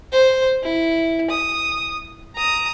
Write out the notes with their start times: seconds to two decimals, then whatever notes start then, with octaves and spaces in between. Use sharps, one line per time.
0.12 C5
0.63 E4
1.30 D#6
2.36 A#5 D#6